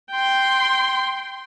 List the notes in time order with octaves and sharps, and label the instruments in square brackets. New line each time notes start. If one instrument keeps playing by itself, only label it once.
[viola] G5 C6